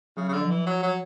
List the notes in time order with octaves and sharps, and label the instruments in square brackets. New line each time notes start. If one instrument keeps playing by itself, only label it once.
[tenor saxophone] C#3 [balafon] F#3
[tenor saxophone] C#3
D3
[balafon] F3
[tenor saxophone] E3
F#3
F#3